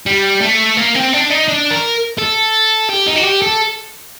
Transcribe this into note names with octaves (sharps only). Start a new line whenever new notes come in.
G3
A3
A#3
C4
D4
D#4
D4
A#4
A4
G4
D#4
F#4
G4
A4